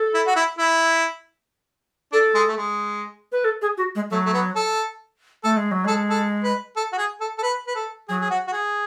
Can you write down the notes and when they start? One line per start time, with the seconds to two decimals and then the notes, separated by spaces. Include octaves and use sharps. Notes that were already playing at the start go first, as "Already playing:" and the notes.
Already playing: A4
0.14 E4
0.26 F#4
0.36 E4
0.58 E4
2.12 D4 A4
2.34 G#3
2.48 A3
2.57 G#3
3.32 B4
3.44 A4
3.62 G#4
3.78 F#4
3.95 G#3
4.11 F#3 A3
4.26 A3
4.33 B3
4.56 A4
5.44 A3 A4
5.57 G#3
5.71 F#3
5.85 G#3 A4
6.10 A4
6.43 B4
6.76 A4
6.93 F#4
6.98 G#4
7.20 A4
7.38 A4
7.43 B4
7.67 B4
7.75 A4
8.08 F#3 G#4
8.21 G#4
8.31 F#4
8.47 F#4
8.52 G#4